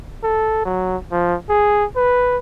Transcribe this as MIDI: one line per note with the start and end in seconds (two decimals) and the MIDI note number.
0.23 0.65 69
0.65 0.97 54
1.11 1.35 53
1.50 1.85 68
1.96 2.38 71